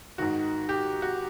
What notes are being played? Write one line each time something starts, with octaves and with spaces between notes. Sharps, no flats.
G#2 D#3 F#4
G4
F#4